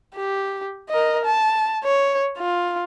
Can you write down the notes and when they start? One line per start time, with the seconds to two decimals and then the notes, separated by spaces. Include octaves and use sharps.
0.15 G4
0.90 A#4 D#5
1.25 A5
1.84 C#5
2.39 F4